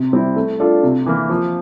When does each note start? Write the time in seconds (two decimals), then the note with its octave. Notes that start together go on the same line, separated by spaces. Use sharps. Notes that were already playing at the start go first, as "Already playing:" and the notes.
Already playing: C3
0.12 G3 C4 E4
0.36 A3
0.60 D4 F4 A4
0.83 C3
1.06 E3 A#3
1.29 F3